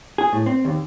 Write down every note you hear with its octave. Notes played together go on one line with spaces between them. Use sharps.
G#4
A2
C4
D#2